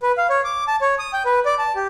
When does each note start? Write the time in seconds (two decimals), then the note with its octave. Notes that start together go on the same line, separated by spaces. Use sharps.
0.03 B4
0.18 F5
0.30 C#5
0.44 D6
0.68 A5
0.81 C#5
0.99 D#6
1.13 G5
1.25 B4
1.46 D5
1.59 A5
1.75 G4